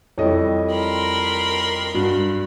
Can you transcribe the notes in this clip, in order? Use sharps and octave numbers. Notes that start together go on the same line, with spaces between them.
F2 G3 E4 A4 C#5 D#5
A#4 B5 C6
G2 F#4